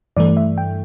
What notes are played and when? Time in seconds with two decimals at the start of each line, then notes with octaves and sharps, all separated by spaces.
0.17 G2 E3 A3 D5
0.37 E5
0.58 G5